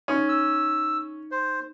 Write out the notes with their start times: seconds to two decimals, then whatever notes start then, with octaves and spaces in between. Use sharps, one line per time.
0.08 C#4 D#4
0.29 E6
1.32 C5